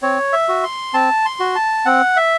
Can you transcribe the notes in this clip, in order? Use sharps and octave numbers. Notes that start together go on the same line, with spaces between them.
C4 C#5
E5
F#4
C6
C4 A5
C6
F#4
A5
C4 F#5
E5